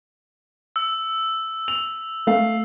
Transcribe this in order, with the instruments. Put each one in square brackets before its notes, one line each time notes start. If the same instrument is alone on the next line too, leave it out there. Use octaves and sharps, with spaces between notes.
[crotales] E6
[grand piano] F7
A3 F5